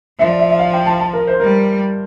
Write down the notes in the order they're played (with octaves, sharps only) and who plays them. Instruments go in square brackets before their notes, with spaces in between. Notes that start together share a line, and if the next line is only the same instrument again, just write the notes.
[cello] F3 [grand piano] E5
[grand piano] D5
E5
E5
F5
G5
A5
A5
A#4
C5
[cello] G3 [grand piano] A#4